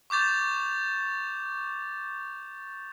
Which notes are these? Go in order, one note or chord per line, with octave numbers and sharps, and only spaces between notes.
C#6 D6 G6 A6 F7